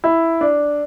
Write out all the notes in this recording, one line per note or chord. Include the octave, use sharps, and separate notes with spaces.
E4
D4